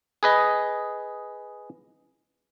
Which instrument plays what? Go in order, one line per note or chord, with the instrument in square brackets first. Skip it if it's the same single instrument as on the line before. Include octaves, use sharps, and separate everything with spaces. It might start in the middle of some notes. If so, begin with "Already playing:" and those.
[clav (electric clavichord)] G#4 B4 D#5